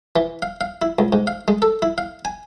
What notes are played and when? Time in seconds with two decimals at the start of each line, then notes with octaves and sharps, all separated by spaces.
0.16 E3
0.42 F5
0.61 F5
0.82 E4
0.99 C#2
1.13 G#2
1.27 F5
1.48 G#3
1.62 A4
1.82 E4
1.98 F5
2.25 G#5